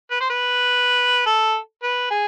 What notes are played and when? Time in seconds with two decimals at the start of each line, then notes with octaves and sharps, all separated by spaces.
0.11 B4
0.20 C5
0.30 B4
1.26 A4
1.83 B4
2.11 G#4